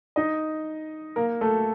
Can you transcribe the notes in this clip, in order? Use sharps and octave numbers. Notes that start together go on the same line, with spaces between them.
D#4 D#5
A#3 A#4
A3 A4